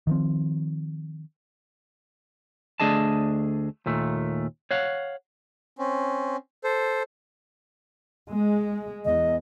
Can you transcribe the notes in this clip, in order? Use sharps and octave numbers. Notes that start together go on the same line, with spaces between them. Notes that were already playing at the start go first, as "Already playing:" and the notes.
D#3 F3 C4
D2 A3 D4 G#4 D#5 A5
D#2 A#2 A3
C#5 F5 F#5
C4 C#4
A4 C5
G#3
E2 D#5